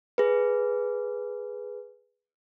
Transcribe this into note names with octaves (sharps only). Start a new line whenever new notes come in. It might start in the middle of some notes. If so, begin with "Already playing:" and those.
G#4 B4